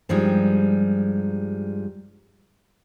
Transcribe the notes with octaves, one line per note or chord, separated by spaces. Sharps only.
G2 F3 G3 G#3 D#4